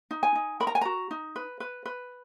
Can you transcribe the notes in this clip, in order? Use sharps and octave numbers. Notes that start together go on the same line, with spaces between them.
D#4
G#5
D#4
A#4 B5
A#5
G#5
F#4 A#5
D#4
B4
B4
B4